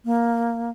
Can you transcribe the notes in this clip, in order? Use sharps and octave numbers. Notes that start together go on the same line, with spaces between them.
A#3